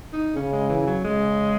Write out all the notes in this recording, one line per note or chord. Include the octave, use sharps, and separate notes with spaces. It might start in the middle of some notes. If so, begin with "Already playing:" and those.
D#4
C#3 C#4
G#3
E3
E3
F#3
C#3 G#3